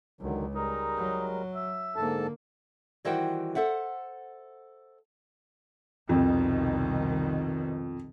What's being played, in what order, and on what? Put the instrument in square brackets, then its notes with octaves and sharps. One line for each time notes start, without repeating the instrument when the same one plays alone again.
[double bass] C#2 [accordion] D3 D#3 F#3
[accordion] G3 G#3 A#4 [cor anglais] D#4
[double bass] F#3
[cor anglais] E5
[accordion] G#2 A4 A5 [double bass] D3 A#3
[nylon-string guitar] D#3 E3 G3 F#4 C5 G5
A4 C5 E5 F#5
[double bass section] C2 B2 D#3 [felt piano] F2